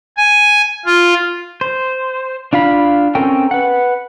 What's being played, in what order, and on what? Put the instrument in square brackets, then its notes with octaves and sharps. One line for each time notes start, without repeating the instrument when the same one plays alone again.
[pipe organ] G#5
F4
[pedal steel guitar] C5
D4 F4 F5 B5
C4 C#4 A4 A#4 G5
B4 F#5